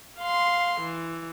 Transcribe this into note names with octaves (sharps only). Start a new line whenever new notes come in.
F5 C6
E3